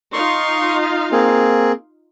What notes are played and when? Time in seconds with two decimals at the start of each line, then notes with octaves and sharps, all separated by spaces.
0.13 D#4 F4 F5 C6 C#6
1.12 A#3 C4 G#4